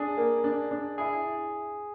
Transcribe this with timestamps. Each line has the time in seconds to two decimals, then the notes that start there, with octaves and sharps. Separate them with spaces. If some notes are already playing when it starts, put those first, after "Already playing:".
Already playing: D4 G#4
0.17 A#3
0.44 D4
0.71 D4
0.98 E4 G#4